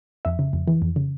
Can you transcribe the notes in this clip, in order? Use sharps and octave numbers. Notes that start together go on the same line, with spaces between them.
F2 E5
C#3
F2
E3
F2
C#3